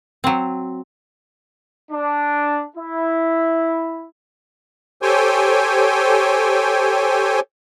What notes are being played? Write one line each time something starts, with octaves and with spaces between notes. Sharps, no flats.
F#3 C4
D4
E4
G4 A4 C5 C#5 G5 G#5